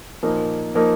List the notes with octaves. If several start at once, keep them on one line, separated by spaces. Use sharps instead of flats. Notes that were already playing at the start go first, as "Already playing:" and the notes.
A#2 F3 A#3 D#4 A#4
A#2 F3 A#3 D#4 A#4